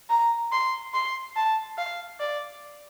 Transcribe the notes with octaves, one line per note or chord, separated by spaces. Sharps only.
A#5
C6
C6
A5
F5
D5